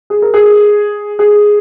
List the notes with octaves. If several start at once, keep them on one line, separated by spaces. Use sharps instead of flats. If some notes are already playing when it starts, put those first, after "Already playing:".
G#4
A#4
G#4
G#4